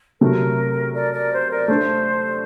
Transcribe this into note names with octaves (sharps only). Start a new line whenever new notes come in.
C3 F#3 A3 A#4
A#4 D5
A#4 D5
C5
A#4 D5
A3 D4 A4 C5